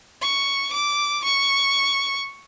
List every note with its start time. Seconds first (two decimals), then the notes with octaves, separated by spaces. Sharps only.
0.22 C#6
0.73 D6
1.24 C#6